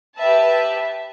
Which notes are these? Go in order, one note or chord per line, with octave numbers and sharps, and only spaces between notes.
G4 B4 E5 A5